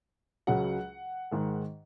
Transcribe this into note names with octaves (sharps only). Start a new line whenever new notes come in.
C#2 C#3 F#3 F#5
G#2 D#3 G#3